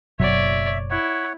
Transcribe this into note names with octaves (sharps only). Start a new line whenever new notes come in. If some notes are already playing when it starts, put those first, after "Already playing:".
F#1 B2 F#3 C#5 D5 E5
E4 C#5 F#5